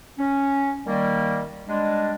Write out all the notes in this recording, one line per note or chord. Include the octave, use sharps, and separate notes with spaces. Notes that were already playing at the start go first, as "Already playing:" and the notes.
C#4
D#3 G3 A#3
G3 G#3 D4